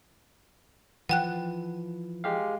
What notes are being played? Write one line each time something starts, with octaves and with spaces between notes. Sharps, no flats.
E3 F3 F#5 G5 F#6
G#3 G4 F5